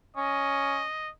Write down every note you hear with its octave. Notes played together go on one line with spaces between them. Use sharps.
C#4 D#5